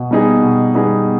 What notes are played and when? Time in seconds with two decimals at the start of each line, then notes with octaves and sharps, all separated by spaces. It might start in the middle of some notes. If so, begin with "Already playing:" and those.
Already playing: B2
0.11 G3 B3 D#4 G#4
0.43 B2
0.74 G3 B3 D#4 G#4